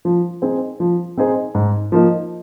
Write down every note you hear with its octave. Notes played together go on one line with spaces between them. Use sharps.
F3
C4 D#4 G#4 C5
F3
C4 D#4 G#4 C5
G#2
F3 A#3 D#4